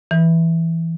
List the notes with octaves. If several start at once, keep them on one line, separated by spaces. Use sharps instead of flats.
E3